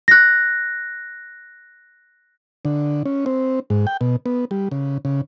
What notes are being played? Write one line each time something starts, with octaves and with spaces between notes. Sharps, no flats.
F#6 A#6
D3
C#4
C4
G#2
G5
B2
B3
G3
C#3
C#3